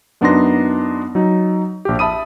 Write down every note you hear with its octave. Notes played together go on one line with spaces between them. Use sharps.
F#2 B3 D4 D#4 C6 A#6
F#3 D#4
A#1 G4
E5 A5 B5 D#6 D#7